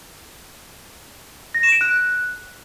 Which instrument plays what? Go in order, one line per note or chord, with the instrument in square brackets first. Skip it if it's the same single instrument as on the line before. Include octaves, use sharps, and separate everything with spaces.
[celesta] A#6
E7
D7
F#6